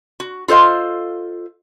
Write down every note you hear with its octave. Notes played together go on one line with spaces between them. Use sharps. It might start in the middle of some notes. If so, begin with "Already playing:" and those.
F#4
F4 A4 C5 D#5 F5